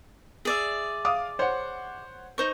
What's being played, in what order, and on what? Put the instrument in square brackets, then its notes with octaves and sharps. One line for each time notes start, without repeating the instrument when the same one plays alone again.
[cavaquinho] G#4 D5 E5
[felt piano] F5 D6 D#6
C5 C#5 F#5
[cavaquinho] D#4 C5 C#6